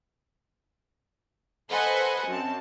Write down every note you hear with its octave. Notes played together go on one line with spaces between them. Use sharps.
A4 B4 C5 D#5 F#5 G#5
F#2 C4 A5